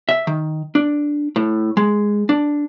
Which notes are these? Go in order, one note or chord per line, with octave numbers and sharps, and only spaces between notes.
E5
D#3
D4
A2
G#3
D4